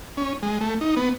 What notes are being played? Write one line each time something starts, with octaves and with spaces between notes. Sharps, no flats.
C#4
G#3
A3
D#4
B3